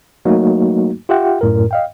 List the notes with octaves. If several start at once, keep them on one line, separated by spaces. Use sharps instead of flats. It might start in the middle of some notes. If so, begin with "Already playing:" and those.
F#3 A3 A#3 D#4 F#4
F4 G4 E5 F#5 G5
F#2 A2 A#4
D#5 F5 G5